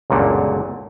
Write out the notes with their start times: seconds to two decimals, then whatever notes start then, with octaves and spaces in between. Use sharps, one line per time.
0.10 G1 C#2 F#2 A#2 D3